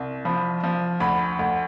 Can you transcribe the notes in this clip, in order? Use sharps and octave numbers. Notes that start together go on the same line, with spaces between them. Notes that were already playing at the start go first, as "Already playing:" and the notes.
Already playing: C2
F3 B5
F3
D2 B5
D2